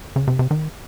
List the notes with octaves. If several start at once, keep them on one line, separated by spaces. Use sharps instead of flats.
C#3
C3
C3
D#3